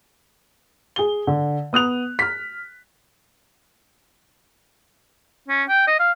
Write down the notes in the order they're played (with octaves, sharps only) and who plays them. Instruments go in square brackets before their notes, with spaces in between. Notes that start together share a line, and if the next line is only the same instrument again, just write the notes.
[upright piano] G#4 G7
D3
B3 D#6 F#6 F7
F6 B6
[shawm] C#4
G5
D#5
F5